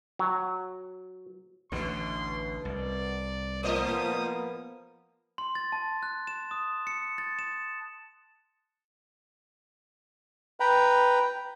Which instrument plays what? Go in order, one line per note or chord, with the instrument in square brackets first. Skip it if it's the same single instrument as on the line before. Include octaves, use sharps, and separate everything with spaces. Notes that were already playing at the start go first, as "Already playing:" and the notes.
[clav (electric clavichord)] F#3
[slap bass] A1 D2 D3 [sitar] B2 [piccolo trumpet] C6
[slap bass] C2 [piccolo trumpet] D5
[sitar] A2 C5 D#5 [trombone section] F3 A#3 B3 [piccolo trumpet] D#6
[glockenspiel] C6
A6
A5
F#6
E7
D#6
C#7
A6
E7
[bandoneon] B4 G5 A#5 B5